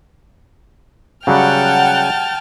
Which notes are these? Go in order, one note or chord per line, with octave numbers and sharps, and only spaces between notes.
C#3 F#3 G3 F#5 G5 A5 F6